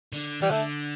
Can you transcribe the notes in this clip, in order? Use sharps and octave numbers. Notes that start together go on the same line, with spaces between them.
D3
E3 G3
D3 A3